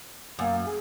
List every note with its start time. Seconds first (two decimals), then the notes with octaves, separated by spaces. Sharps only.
0.39 F#2 A#3
0.65 G#4